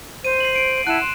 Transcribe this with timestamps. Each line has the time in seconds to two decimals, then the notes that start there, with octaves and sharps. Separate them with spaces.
0.25 C5 D#7
0.40 C7 F#7
0.55 D7
0.87 E4 F#5 A5 F#6 E7
1.01 C6